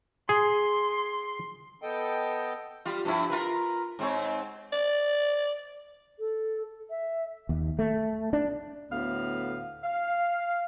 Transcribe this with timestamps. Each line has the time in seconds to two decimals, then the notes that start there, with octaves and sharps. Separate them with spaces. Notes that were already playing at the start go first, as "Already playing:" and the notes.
0.29 G#4 C6
1.82 B3 A4 D#5 G5
2.86 G3 F4
3.05 G2 F3 E4
3.30 F4 A#4 B4
3.99 G#2 C4 C#5
4.73 D5
6.19 A4
6.90 E5
7.49 D#2
7.79 A3
8.33 D4
8.92 D2 A2 B3 F5
9.84 F5